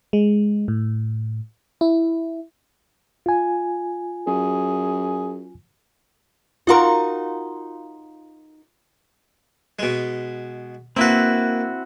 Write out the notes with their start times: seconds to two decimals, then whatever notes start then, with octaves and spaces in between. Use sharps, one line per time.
0.13 G#3
0.68 A2
1.81 E4
3.26 F4 G#5
4.27 F#2 G#4
6.67 D#4 F4 F#4 A#4 F5 C6
9.79 B2 G#3
10.96 A#3 C4 E4 F#4 B4